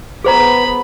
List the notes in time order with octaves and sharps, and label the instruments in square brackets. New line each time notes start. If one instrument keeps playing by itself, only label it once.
[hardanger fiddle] B3 B5 [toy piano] G#4 C5 A#5